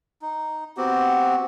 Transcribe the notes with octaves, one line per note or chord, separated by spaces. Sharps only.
D#4
B3 C4 F#4 G4